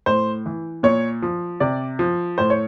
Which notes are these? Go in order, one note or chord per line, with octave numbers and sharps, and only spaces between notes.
A2 C5
E3
A#2 C#5
F3
C3 D5
F3
A2 C5
C#5